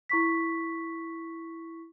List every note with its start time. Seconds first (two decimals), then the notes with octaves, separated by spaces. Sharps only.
0.09 E4 C#6 B6